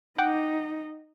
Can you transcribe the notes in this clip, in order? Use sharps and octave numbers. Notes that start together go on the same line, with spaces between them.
D#4 F#5 G5 D6